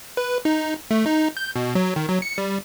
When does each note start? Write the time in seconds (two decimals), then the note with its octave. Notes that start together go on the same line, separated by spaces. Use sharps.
0.17 B4
0.45 D#4
0.91 A3
1.06 D#4
1.37 G6
1.56 B2
1.75 F#3
1.96 D#3
2.10 F#3
2.22 C#7
2.38 G3